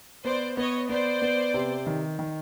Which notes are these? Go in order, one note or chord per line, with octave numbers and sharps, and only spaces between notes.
B3 C5 D5
B3 C#5 D#5
B3 C5 D5
B3
C3
D#3
D#3